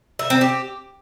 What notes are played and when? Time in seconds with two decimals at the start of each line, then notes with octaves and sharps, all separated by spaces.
0.19 E5
0.30 C4
0.41 G4